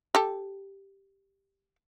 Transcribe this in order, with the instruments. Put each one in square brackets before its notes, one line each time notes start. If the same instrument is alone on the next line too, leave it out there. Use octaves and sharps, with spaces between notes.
[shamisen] G4 A4